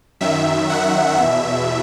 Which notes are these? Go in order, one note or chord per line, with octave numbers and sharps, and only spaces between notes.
F#2 D#3 E5
F#5
E2 B2 E5